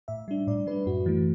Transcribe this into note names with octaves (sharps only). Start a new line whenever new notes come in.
A2 E5
G3 D4
A2 D5
G3 D4 B4
F#2 F#4
E3 A3